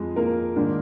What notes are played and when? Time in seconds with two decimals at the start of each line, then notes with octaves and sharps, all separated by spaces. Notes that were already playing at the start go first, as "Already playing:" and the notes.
Already playing: F2 F3 G#3 G#4
0.16 A#3 A#4
0.56 G#2 D#3 A#3 D4